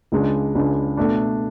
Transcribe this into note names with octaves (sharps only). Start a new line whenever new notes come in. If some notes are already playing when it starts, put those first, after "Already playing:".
C#2 C#3 G#3 D4
C#2 C#3 G#3 D4
B2 A3 D4